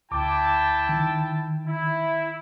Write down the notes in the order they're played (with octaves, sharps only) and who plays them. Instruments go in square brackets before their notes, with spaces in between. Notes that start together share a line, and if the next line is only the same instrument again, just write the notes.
[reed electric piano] D2 D6 [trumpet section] E4 G5 A5
[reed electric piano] D#3
[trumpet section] E4